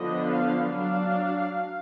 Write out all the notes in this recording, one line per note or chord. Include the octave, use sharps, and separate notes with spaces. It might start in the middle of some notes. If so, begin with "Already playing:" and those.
Already playing: D3 F3 B3 D4 D#5
F5
F#3 D4 F5